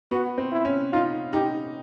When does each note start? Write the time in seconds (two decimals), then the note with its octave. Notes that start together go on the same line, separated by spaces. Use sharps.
0.11 B3 F#4
0.38 C4
0.52 E4
0.65 C#4
0.92 D#4 F4
1.33 D#4 G4